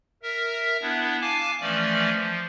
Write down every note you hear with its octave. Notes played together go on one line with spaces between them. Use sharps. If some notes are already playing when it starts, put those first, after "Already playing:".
A#4 E5
B3 D4 E4
F5 G#5 A5 D6
E3 F3 A3 C#4 D5
F3